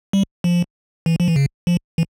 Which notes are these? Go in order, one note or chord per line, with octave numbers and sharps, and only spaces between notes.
G3
F3
E3
F3
E3
C#3
F3
E3